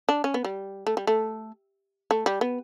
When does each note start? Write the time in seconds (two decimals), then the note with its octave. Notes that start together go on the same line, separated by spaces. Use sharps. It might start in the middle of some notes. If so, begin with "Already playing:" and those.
0.09 D4
0.24 C#4
0.34 B3
0.44 G3
0.87 A3
0.97 G3
1.07 A3
2.11 A3
2.26 G3
2.41 B3